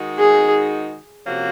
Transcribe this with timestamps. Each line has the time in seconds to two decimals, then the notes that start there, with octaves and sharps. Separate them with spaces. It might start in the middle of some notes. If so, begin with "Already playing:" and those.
Already playing: D#3 G#3 D#4 F#4
0.18 G#4
1.26 C3 F3 A#3 C#4 F#4